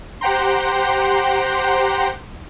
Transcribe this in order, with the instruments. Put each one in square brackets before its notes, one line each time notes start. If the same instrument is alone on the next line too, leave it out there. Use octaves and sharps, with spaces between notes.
[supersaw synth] G4 C5 F#5 G5 A#5 C6